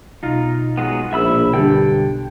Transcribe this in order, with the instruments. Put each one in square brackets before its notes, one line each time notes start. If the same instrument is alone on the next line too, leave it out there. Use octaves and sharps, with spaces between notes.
[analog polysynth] B1 [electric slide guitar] D#4 F4
[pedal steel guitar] F#3 G#3 B3
[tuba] A#1 [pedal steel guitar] E5 B5 E6
[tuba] G2 [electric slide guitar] D3 [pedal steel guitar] G5